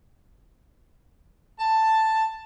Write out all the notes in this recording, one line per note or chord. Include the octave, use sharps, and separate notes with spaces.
A5